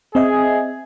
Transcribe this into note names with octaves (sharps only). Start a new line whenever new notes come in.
C4 G#4 D#5 E5